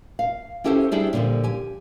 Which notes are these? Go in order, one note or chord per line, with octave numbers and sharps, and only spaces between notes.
F5
C#4 E4 G4 A4 A#4 C5
G3 D4 E4 G4 G#4 C5
A#2 D3 D#3 F3 G3
G4 G#5